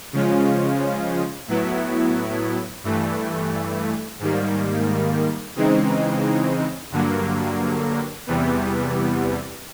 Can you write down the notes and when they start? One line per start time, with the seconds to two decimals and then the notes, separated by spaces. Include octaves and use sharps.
0.13 C#3 F3 G#3 C#4 F4
1.48 A2 F#3 B3 E4
2.84 G2 E3 A3
4.19 G#2 D#3 G3 A#3
5.55 C#3 E3 G#3 C4 D#4
6.91 G2 D3 F#3 A#3
8.27 E2 C3 E3 G3 B3